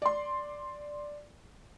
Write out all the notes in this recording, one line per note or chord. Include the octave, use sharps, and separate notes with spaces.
D5 C6